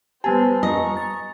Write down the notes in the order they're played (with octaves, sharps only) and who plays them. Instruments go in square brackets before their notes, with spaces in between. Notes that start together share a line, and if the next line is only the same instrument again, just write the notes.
[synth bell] G3 B3 G4 [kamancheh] B4 C5 [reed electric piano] G#5 A5
[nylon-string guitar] D#5 [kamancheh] A#5 C#6
[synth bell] A6